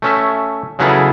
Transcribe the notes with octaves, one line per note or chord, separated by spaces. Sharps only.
A3 C#4 E5
C#3 F#3 B3 E4 G#4 A4